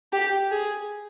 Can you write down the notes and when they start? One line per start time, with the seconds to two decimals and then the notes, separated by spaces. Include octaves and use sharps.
0.13 G4
0.51 G#4